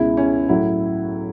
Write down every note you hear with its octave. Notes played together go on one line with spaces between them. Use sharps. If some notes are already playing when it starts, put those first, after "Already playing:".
Already playing: C#2 B2 G#3 E4
C#4
A2 F#3 E4